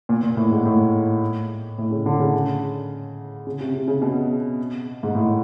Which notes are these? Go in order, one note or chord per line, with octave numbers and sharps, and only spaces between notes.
A#2
A#2
A2
G#2
A2
A2
C#3
D3
C#3
C#3
C3
C3
C#3
B2
G#2
A2